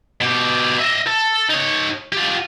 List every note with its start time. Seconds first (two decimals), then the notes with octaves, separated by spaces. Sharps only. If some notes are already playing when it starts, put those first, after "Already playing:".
0.21 B2 G4
0.80 D#5 E5
1.07 A4
1.50 D#4 C#5
2.12 F4 G4